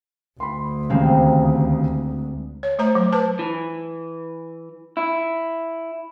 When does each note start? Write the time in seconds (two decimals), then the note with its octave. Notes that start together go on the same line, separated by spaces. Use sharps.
0.40 D2 B5 C6
0.90 D#2 C#3 G#3 C4 D#4
2.63 C#5
2.79 A3 C5 A#5
2.95 F#3
3.13 B4 C5 A5
3.39 E3
4.97 E4